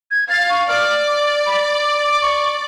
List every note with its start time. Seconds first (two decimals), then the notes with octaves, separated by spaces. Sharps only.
0.11 G#6
0.30 F5 A6
0.50 C#6
0.68 D5 F6
1.07 D6
1.46 B5
1.84 D6
2.04 D6
2.22 C#6